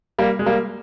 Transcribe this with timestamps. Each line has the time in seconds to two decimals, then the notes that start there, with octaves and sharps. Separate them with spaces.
0.18 G3 A#3
0.39 G#3
0.46 G3 A#3